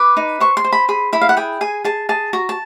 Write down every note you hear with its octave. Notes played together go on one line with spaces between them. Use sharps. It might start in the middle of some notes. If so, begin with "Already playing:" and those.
Already playing: B4 D6
D#4
C5 C#6
C6
C5
B5
G#4 B5
E4 B5
F5
F#5
G#4 G5
G#4 G#5
G#4 A5
G#4 A5
F#4 A#5
A5